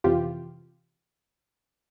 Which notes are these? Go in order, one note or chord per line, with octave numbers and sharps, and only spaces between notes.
F2 C3 E3 F4 G4